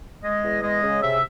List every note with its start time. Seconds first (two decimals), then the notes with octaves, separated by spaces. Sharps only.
0.23 G#3 D#5
0.44 E2
0.62 G#3 D#5
0.82 C#3
1.02 C3 E5